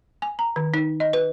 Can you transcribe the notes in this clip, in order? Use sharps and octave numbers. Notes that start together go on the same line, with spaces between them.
G#5
A#5
D#3
D#4
D#5
B4